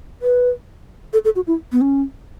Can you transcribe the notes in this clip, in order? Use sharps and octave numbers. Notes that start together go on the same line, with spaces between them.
B4
A4
A4
F#4
E4
B3
C#4